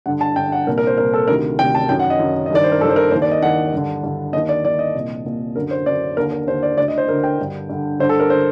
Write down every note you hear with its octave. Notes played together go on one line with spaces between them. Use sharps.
G2 D3 F#5
A5
G2 D3 G5
F#5
C2 A#2 A#4
A#4
C5
C2 A#2 A#4
A4
D2 C3 D#3 A#4
D2 C3 D#3 G5
A5
F#2 D#3 G5
F#5
D#5
F#2 D#3
D#5
G2 D#3 D5
C5
A#4
G2 D#3 A4 C5
A#4
D#2 D#3 C5
D5
D#5
D#2 D#3 F#5
G2 D3
G2 D3
D#2 D#3 D#5
D5
D#2 D#3 D5
D#5
C2 A#2
C2 A#2
F#2 D3 A#4
C5
F#2 D3 D5
D#2 D3 A#4
A#4
D#2 D3 C5
D5
D2 D3 D5
D#5
C5
D2 D3 A#4
G5
G2 D3
G2 D3
G2 D3 C5
A4
A#4
C5
D3